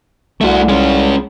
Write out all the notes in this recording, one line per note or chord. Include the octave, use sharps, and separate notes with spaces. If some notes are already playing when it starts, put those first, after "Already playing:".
C2 A3 F#4
G#3 C#4